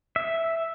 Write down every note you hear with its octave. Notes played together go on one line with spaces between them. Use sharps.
E5